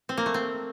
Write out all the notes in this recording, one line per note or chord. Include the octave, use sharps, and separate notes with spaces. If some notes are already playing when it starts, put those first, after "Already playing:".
C4
A#3
A3
C4